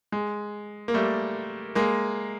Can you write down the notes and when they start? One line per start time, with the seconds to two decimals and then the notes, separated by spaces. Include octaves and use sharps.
0.12 G#3
0.88 A#3
0.94 G3 A3
1.75 G#3 A#3